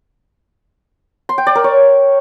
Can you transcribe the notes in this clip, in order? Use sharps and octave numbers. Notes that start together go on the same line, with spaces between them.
C6
G5
D5
A#4
C#5